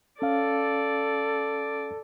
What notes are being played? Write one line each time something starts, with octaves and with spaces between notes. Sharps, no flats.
C#4 A4 D5 F5